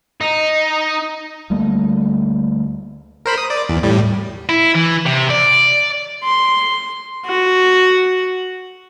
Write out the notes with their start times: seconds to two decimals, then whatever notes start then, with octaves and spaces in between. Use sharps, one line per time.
0.21 D#4
1.50 D2 G3 A3 A#3
3.26 A#4 C5 B5
3.38 D#6
3.50 D5
3.69 E2
3.83 A2 G3
4.49 E4
4.75 E3
5.06 C3
5.30 D5
6.23 C6
7.25 F#4